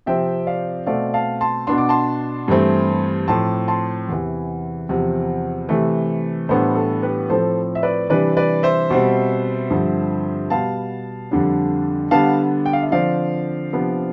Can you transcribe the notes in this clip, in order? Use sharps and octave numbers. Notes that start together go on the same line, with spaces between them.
C3 F3 C4 E5 G5
D5 F5
B2 A3 C4 D5 F5
F5 A5
A5 C6
B2 B3 D4 C6
D6
A5 C6
G2 E3 A3 C4
A2 F3 C4 A5 C6
A5 C6
E2 C3 E3
E2 C3 F3
C3 E3 A3
A2 E3 G3 B3 D4 A4 C5
A4
G4 B4
A2 F3 C4 A4 C5
E5
B4 D5
C3 E3 G3 D4 B4 D5
B4 D5
C5 E5
B2 G3 C4
G2 D3 F3 C4
B2 G3 B3 F5 A5
F2 D3 G3 D4
D3 G3 B3 D4 F5 A5
G5
F5
E5
D3 F3 C4 D5 F5
C3 F3 B3 D4